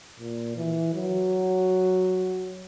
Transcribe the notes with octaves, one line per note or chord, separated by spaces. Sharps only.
A#2
E3
F#3